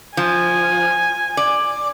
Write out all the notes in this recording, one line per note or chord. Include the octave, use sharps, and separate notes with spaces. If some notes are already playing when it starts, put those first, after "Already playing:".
F3 G#5
D5